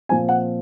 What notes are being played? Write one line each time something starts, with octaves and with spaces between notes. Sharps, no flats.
A#2 F3 C4 G#5
F#5